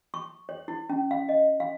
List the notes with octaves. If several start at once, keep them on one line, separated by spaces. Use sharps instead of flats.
C#6
C#5
E4
C#4
F5
D#5
F5